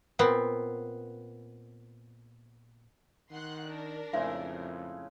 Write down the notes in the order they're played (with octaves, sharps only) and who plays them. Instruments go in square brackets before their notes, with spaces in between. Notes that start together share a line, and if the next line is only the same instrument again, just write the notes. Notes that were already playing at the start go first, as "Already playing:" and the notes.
[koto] A#2 B3 C4
[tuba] D#3 [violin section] F#5 C6 F#6
[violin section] D4 A#4
[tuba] F2 [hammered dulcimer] A2 C#3 G#3 [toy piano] C5 E5